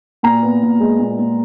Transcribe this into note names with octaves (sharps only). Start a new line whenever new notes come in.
A#2 A#5
B3
A#2
G#3
A#2
A#2